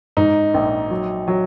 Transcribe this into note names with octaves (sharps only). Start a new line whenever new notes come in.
G#2 D#4
A#1
F#3
F#3